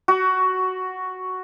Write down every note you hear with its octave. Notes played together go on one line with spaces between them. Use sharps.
F#4